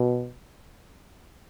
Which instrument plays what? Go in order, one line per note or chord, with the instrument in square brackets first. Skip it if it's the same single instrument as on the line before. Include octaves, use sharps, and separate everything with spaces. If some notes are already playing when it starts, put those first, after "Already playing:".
Already playing: [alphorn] B2